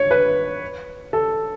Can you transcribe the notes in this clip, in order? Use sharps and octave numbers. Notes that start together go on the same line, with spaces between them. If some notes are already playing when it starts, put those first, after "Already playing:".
Already playing: C#5
B4
A4